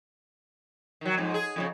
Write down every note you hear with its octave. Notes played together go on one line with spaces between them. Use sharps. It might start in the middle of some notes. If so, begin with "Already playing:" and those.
D#3 F#3
F2 G#2
G#4
F2 A2 C#3